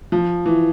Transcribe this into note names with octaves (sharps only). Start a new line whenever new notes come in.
F3
E3